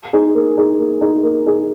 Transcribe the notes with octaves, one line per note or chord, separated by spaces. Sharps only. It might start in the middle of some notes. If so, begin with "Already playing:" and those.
D#4 G#4
A#3
D#4 G#4
A#3
D#4 G#4
A#3
D#4 G#4